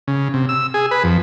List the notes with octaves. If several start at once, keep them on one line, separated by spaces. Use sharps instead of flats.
C#3
C3
E6
G#4
B4
F2